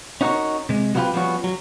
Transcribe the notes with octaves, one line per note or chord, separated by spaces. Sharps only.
C#4 D#4 F#4 A4 A#4 C#5
C3 G#3
F#3 B3 C4 F4 G4 B4
F3 G3 B3 C#4 F#4
F#3